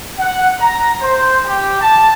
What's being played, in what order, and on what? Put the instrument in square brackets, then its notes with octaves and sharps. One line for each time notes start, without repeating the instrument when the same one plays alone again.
[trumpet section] F#5
A#5
C5
G4
A5